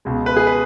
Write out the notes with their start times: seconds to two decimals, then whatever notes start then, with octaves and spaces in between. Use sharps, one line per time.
0.05 C#2 B2 G#3
0.26 B4
0.37 G#4
0.47 B4